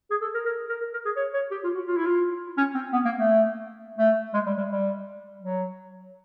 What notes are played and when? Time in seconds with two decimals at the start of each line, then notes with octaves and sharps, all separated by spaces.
0.11 G#4
0.22 A4
0.34 A#4
0.46 A#4
0.69 A#4
0.81 A#4
0.94 A#4
1.05 G#4
1.17 C#5
1.34 C#5
1.51 G4
1.64 F4
1.75 F#4
1.87 F4
1.97 E4
2.07 F4
2.58 C#4
2.75 C4
2.93 B3
3.05 A#3
3.17 A3
3.99 A3
4.34 G#3
4.47 G3
4.58 G3
4.70 G3
5.41 F#3